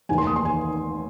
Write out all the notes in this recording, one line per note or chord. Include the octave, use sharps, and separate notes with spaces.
F1 D#2 D#3 G#5
C6
D#6
C6
G#5